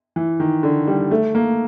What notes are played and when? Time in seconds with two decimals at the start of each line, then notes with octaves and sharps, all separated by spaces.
0.16 E3
0.40 D#3
0.63 D3
0.87 G3
1.11 A3
1.35 A#3